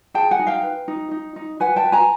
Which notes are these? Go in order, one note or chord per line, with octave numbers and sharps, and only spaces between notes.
G#4 G5 A5
F#5 G#5
D#4
F5 G5
B4
D#4
D#4
D#4
B4 F#5 G#5
G5 A5
B4
G#5 A#5